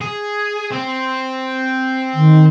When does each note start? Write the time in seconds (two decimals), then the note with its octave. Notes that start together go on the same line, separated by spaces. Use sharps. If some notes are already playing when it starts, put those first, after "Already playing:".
0.01 G#4
0.72 C4
2.14 D#3